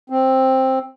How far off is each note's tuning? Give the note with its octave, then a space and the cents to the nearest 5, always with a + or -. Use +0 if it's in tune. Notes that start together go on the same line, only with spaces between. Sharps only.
C4 +10